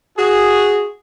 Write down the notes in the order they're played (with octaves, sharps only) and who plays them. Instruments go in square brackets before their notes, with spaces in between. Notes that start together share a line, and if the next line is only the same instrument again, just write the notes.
[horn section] F#4 G#4